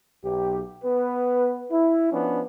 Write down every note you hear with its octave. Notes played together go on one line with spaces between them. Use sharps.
B1 G4
B3 B4
E4
F3 B3 C#4 D4